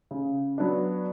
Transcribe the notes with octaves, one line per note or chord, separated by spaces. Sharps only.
C#3
F#3 B3 D4